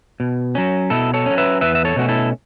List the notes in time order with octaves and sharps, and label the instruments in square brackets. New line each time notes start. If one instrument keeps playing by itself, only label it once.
[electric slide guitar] B2
F#3 C#4
B2 E4 A4
A4 C#5
F#3 C#4
B4 E5
E2 B4 E5
E5
A4 C#5
B2 A3 C#4 F#4
E4 A4